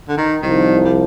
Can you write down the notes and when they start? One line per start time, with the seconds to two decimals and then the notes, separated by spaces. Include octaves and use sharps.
0.08 D3
0.17 D#3
0.42 C2 C3 D#3 F3
0.85 G3